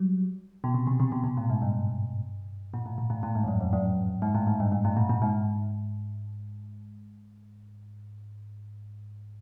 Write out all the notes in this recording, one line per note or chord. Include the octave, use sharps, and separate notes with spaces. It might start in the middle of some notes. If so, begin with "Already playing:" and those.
Already playing: F#3 G3
B2
C3
C3
C3
B2
B2
A2
G#2
G2
A#2
A2
A#2
A2
A2
G#2
F2
F#2
F2
F#2
G#2
A2
G#2
G2
G2
A2
A#2
A#2
G#2